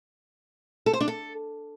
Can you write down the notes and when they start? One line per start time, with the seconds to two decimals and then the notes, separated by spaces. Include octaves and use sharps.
0.86 A4
0.93 C5
1.01 D4
1.08 A4